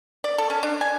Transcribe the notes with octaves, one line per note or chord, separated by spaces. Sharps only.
D5
A4
C#4
D4
G#5